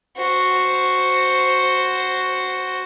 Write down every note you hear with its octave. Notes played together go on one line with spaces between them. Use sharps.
F#4 C5